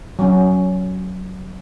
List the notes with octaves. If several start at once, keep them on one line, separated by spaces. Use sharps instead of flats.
F#3 C#4